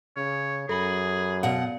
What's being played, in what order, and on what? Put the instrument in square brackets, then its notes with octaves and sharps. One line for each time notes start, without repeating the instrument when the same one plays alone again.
[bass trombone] C#3 [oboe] C#5
[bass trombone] F#2 [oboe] G#4 [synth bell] A4 B5 F#7
[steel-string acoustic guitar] B2 F#5 [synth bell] D5 F5